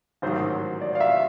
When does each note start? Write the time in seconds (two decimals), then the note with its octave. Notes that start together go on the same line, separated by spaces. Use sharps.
0.22 A1 G#2 D#3 F#3 C5
0.81 D5
0.95 F5
1.01 E5